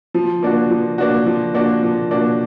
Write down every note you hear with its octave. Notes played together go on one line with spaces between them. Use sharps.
F3
A#3 D4 F#4
F3
A#3 D4 F#4
F3
A#3 D4 F#4
F3
A#3 D4 F#4